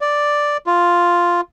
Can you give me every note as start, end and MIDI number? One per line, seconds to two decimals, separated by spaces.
0.01 0.57 74
0.67 1.41 65